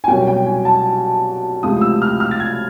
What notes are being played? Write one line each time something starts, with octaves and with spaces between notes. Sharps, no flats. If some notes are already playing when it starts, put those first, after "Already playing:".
G#5
C2 B2 F#3 A#3 C#4 G5
G5
G#5
A5
C#2 C3 F3 A3 D#6
E6
F6
F6
A6
G#6